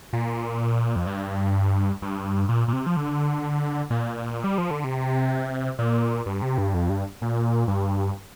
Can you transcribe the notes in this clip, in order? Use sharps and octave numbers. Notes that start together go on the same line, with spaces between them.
A#2
F2
G2
G2
A#2
A#2
C3
F3
D3
A#2
G3
F3
D3
C3
A#2
G2
C3
G2
F2
G2
A#2
G2